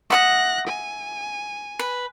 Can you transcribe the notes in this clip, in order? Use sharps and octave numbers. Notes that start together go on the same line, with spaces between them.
E5 F#5 D#6 F#6 A#6
G#5
B4